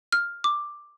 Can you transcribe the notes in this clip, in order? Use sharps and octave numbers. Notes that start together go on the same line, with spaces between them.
F6
D6